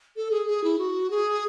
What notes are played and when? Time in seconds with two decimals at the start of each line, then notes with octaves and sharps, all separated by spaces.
0.16 A4
0.31 G#4
0.48 G#4
0.64 E4
0.79 F#4
1.11 G#4